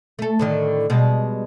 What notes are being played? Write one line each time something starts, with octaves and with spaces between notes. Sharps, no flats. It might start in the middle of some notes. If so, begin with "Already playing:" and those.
A3 A4
A2 D3 D#3
B2 G3 G#3